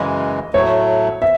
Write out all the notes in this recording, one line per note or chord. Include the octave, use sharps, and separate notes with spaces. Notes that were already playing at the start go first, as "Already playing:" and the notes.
Already playing: F#2 C#3 E3 G#3 D#5
A2 F#3 A3 C#5
E5